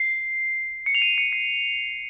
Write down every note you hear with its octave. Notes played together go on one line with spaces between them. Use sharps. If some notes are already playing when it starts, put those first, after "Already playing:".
Already playing: C7
C#7
F7
D#7
C#7
C7